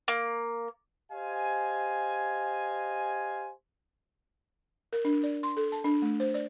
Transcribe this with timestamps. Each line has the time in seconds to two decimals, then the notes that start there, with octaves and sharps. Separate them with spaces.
0.08 A#3
1.12 G4 C5 D#5 F5 G#5
4.93 A#4
5.05 D4
5.23 D5
5.43 C6
5.57 A4
5.72 A5
5.84 D4
6.02 A3
6.20 C5
6.34 D5